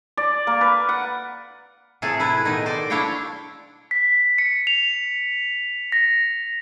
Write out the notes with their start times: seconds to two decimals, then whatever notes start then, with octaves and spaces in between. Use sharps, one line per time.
0.17 D5
0.47 A#3
0.61 B4
0.89 F#5
2.02 A2 C3 F4 G#4 A4
2.20 E4 B4
2.45 B2 D#3 D#4
2.66 C5 D5
2.90 D4 E4 C#5 F5 G5
3.91 B6
4.38 C#7
4.67 F7
5.92 A#6